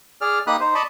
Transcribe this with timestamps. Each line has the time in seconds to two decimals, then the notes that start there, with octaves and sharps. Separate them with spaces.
0.21 G#4 D5 F6
0.47 A#3 D#4 G4 B5 D#6 F#6
0.60 D#4 C5
0.75 D5 D#5 A5 B5 C#6